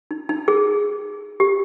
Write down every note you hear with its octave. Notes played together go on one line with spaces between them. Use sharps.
D#4
D#4
G#4
G4